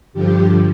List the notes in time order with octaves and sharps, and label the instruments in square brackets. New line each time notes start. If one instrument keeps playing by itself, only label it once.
[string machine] G2 D3 F3 G4